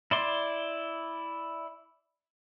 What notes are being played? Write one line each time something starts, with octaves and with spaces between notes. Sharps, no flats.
E4 D5 C6